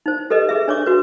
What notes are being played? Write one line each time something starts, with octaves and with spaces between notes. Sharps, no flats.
D#4 C5
G4 A4 B4 D#5
G#4 B4 E5
D4 C#5 C#6 D6
F#4 B4